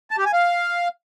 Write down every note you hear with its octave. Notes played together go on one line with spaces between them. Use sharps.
A5
G4
G#5
F5